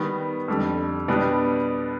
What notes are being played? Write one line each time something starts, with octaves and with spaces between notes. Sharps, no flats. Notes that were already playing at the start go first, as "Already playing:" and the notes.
Already playing: D#3 G3 B3
F2 D3 G3
B2 G3 B3 D4 G4